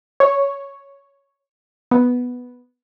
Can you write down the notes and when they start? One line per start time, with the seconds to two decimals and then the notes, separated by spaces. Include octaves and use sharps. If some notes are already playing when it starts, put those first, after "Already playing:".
0.20 C#5
1.91 B3